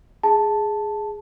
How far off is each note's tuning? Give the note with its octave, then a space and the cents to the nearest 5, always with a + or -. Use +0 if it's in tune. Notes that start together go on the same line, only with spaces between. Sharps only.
G#4 +0 A5 +0